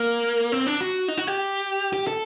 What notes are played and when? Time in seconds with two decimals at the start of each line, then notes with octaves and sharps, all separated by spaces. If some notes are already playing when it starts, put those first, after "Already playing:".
Already playing: A#3
0.52 C4
0.67 D4
0.81 F#4
1.08 D#4
1.17 F#4
1.27 G4
1.93 G4
2.07 A4